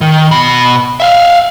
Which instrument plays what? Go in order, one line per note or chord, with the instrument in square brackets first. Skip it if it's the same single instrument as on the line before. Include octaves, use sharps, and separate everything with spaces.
[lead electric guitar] D#3
B2 B5
E5 F5